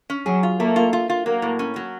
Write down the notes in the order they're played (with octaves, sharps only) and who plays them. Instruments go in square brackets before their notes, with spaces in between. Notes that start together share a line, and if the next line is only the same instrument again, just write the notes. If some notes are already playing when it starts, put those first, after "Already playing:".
[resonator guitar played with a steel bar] C#4
[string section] F#3 [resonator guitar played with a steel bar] G#4
[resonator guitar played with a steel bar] F4
[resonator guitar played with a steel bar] A3 [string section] A#3
[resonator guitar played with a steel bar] F4
F4
F4
[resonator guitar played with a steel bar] F#3 [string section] A#3
[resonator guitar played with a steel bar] A2
C#4
F#3